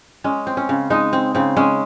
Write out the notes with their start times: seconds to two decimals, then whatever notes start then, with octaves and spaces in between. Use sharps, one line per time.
0.24 G#3 C#4
0.47 C4
0.57 C#4
0.69 C#3
0.90 G#3 D#4
1.13 C4
1.35 C#3 C4
1.57 G#3 C#4